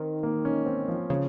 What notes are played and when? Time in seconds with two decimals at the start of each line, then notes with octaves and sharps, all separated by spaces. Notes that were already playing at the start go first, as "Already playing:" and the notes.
Already playing: D#3 C4
0.23 A#3
0.45 C#4
0.66 C4
0.88 F3
1.10 C#3 F3